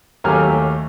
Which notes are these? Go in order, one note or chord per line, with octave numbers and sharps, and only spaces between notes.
D#2 F#3 A3 G4 G#5 F6